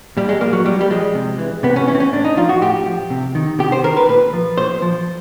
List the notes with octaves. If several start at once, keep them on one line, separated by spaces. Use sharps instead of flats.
A#2 G3
G#3
F3 A#3
F#3
A#2 G3
G3
F3 G#3
C3
E3
C3 B3
C#4
E3 C#4
C4
C#4
A2 D4
D#4
F3 F4
F#4
A2 G4
F3
C3
D#3
C3 G4
C5
D#3 A#4
B4
A#2 B4
F3
A#2 C5
F3